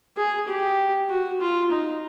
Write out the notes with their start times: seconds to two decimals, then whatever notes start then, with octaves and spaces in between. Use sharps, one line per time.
0.17 G#4
0.48 G4
1.10 F#4
1.41 F4
1.71 D#4